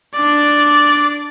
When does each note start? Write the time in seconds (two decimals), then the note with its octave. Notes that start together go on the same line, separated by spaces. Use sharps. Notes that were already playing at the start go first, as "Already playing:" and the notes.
0.14 D4 D5